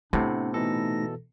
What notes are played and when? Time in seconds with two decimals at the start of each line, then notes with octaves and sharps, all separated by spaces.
0.13 A2 C3 B3 D4 F#5
0.54 B2 E3 A3 D#4 A4 A#6